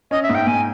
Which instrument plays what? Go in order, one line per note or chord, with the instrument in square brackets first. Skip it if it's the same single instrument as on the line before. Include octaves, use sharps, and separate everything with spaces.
[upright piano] C#4 [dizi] D#5
[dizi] E5
[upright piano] G#2
[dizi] G5
[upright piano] G#2 [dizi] G#5